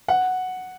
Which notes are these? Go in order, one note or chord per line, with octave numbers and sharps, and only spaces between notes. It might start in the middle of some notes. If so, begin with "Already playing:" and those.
F#5